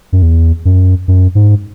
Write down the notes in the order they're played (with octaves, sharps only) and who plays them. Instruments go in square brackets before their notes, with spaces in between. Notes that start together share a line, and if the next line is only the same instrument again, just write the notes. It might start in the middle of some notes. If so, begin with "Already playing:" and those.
[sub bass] F#2
E2
F#2
F#2
G#2